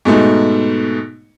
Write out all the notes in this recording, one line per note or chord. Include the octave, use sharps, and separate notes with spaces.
G#2 B2 A3 D#4